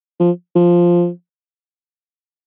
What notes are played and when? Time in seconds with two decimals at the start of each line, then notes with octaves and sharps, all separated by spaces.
0.20 F3
0.56 F3